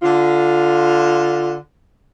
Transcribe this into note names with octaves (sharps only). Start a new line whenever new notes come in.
D3 F4